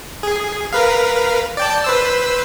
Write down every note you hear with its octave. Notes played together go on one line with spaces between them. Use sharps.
G#4
A#4 B4 F5
D5 G5 A5
B4 C5 E6